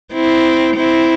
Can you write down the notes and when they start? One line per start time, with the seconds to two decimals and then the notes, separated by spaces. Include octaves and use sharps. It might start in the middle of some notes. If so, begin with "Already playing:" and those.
0.13 C4 E4
0.76 C4 E4